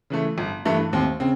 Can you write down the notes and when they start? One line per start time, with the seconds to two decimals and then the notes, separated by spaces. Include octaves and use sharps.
0.10 C#3 E3 A3
0.38 G1
0.65 G2 E3 A3
0.93 D#2 C4
1.20 C#3 C4